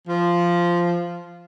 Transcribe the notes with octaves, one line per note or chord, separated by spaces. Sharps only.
F3